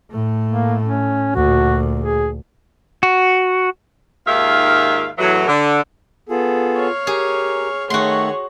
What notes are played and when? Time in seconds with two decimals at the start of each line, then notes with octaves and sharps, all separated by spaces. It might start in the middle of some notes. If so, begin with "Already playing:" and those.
0.11 A2 A3
0.49 A#3
0.84 C#4
1.35 D2 A#2 F#4
2.00 G#4
3.03 F#4
4.26 D#2 G#2 D#3 F4 E5 F5
5.18 E2 A2 E3 F#3
5.47 D3
6.29 B3 F4 G#4 A4
6.76 C#5 F5
7.07 G4 G#4 A#4
7.90 D#3 A3 F#4 G#4 C#5 F#5 C6